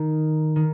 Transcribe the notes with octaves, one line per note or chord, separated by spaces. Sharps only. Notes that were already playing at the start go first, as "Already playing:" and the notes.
Already playing: D#3
D#3